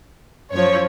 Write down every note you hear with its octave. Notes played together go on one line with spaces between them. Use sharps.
F#2 F3 C#5